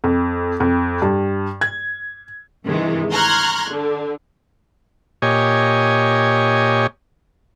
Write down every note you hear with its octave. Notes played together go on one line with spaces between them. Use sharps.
F2
F2
G2
G#6
G2 C3 D#3 E3 G#3
A#5 C6 C#6 F6 F#6 G#6
D3
A#2 G4 C#5 D#5 G#5